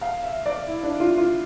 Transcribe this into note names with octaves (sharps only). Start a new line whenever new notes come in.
F5
E5
D5
E4
D4
F4
F4